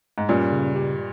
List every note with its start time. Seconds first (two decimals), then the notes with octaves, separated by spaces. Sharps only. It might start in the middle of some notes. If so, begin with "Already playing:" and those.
0.18 G#2
0.29 G2 A#2 C#4
0.52 C#3
0.76 G4